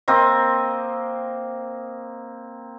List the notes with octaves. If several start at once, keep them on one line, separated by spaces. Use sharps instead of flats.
A#3 C4 D#5